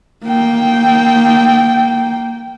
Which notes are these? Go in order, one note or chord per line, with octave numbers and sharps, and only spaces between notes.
A#3 G5